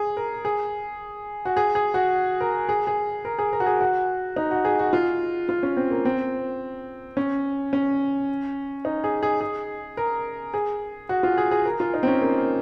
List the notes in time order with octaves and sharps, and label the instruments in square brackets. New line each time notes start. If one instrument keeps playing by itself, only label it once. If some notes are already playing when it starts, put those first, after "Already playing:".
Already playing: [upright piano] G#4
A#4
G#4
F#4
G#4
G#4
F#4
A#4
G#4
G#4
A#4
G#4
A#4
F#4
G#4
F#4
D#4
F#4
G#4
F#4
F4
F4
C#4
C4
A#3
C4
C#4
C#4
D#4
G#4
G#4
G#4
A#4
G#4
F#4
F4
G#4
G#4
A#4
F4
D#4
C4
C#4
A#3